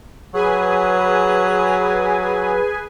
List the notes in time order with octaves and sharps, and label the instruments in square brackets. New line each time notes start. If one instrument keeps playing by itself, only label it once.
[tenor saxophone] F#3 [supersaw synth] G#4 B4 G#5